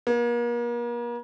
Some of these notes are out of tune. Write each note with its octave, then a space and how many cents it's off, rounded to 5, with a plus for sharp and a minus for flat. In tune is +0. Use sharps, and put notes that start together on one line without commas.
A#3 +40